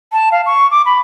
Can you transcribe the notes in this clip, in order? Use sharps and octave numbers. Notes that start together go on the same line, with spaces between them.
A5
F5
C#6
D6
B5